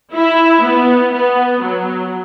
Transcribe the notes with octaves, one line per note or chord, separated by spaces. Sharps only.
E4
B3
B3
F#3